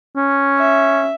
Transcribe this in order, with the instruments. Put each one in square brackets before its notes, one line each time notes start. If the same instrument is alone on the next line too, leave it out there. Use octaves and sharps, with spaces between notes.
[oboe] C#4
[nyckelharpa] E5